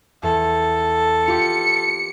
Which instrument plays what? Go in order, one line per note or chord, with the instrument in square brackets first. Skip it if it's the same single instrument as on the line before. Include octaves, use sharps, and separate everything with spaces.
[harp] E2 [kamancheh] A4
[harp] F4 G4 [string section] C#7